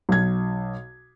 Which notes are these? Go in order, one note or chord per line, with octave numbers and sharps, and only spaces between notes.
B1 G#6